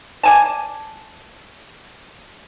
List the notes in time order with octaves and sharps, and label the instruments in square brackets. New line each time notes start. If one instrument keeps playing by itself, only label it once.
[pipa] D5 G#5 A5